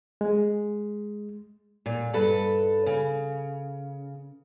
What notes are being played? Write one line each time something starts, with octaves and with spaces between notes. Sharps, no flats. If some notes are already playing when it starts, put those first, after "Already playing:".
G#3
A#2
G2 A4 B4
C#3